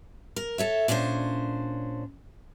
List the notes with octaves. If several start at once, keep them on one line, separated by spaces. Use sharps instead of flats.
A#4
A4 C#5 E5
A#2 C#4 D4 E4 C5